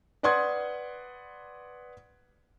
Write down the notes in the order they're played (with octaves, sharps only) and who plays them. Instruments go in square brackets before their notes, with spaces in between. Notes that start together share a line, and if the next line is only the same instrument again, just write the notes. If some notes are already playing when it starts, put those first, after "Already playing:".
[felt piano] B4 D5 F#5 C6 D#6 G#6